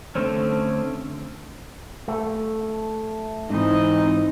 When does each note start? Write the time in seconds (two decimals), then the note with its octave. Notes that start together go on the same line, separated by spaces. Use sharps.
0.15 D3 A3 C4 C#4
2.08 A3
3.50 G#2 E3 C4 D#4 D#5